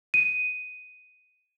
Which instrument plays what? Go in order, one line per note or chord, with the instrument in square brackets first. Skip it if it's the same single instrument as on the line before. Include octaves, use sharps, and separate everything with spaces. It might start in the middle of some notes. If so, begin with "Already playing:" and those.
[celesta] D#7